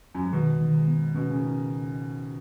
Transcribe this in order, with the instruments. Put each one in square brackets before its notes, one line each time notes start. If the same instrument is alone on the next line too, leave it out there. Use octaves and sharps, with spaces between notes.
[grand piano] F#2
G#2
[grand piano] B2 [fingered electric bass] D#3
[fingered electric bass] D#3
[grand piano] G#2
[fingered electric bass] B3
[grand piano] B2 [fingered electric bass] C#4
[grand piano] C#3
D#3